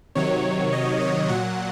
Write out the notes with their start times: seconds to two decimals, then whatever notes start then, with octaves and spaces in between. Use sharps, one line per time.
0.15 C3 D#3 F#3 C#5
0.73 D#5
1.01 D#5
1.29 A#2 F#3 F#5